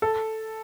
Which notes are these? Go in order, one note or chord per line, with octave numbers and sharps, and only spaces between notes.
A4